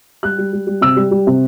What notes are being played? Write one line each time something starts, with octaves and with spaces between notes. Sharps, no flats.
G3 F#6
G3
G3
G3
C3 E6
G3
G3
C3